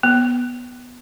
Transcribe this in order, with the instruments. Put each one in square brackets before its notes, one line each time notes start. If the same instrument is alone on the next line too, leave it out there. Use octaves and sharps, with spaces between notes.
[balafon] B3